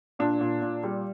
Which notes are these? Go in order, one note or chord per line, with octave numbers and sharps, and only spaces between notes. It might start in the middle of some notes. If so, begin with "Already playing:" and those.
A#2 D4
A#2
A#2
G3